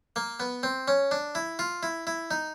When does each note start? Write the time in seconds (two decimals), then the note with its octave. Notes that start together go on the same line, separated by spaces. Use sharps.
0.16 A#3
0.40 B3
0.63 C4
0.88 C#4
1.11 D4
1.35 E4
1.59 F4
1.83 E4
2.07 E4
2.31 D#4